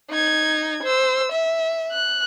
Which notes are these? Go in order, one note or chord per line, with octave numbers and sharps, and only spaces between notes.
D#4 G#6
C5 E6
E5
F#6